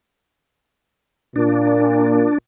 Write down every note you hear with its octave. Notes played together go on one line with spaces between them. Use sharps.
A#2 D4